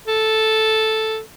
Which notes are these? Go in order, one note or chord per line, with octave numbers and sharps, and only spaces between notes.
A4